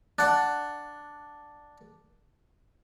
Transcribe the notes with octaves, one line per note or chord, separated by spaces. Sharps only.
D4 F#5